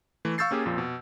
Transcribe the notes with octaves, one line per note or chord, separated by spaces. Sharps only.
E3 A3
F5 C#6 E6 G6 A6 C7
A#3 C#4 G4 G#4
F2 A#2 F3
B2